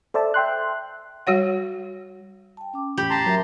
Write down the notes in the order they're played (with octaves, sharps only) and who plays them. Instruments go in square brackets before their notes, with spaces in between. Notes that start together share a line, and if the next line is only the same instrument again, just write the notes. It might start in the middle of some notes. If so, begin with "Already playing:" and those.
[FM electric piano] A4 C5 D5 E5 A5
E5 G5 C6 F#6
[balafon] G3 F#4 C#5 F#5
[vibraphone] G5 A5
C#4 D6
[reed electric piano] E2 A2 [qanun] G4 G5 B5
[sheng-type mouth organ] A5 A#5 C6
[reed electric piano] F#3 [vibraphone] A#4 E5